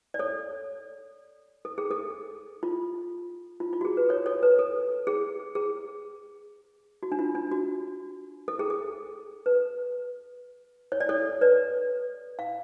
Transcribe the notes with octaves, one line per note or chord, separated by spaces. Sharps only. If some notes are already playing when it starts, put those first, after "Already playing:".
D5
A4 C#5
A4
G#4
A4
F4
F4
F4
F#4
G#4
B4
A4 C#5
A4 C#5
B4
A4
G#4
G#4
F#4
D4
F4
D4
F#4
A4
G#4
A4
B4
C#5
D5
A4 C#5
B4 D5
F5